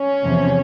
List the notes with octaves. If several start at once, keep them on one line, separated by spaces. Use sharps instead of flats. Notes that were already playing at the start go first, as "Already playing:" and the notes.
Already playing: C#4
E2 C3 F3